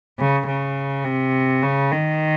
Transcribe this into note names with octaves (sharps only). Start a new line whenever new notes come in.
C#3
C#3
C3
C#3
D#3